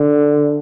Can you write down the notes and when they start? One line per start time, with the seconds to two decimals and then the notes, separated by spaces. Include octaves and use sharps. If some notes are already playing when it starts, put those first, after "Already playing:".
Already playing: D3